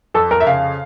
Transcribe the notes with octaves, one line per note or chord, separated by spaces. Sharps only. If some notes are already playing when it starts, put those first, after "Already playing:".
F2 A4
F2 A#4
E5
C#3 F5